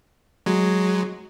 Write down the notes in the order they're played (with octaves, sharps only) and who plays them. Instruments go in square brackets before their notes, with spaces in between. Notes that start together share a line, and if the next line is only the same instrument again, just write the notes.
[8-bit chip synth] F#3 G#3